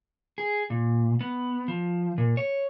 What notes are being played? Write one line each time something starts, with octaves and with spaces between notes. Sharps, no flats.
G#4
A#2
B3
F3
A#2
C#5